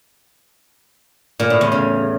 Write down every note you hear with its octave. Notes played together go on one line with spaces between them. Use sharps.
A#2
A2
E2
C#3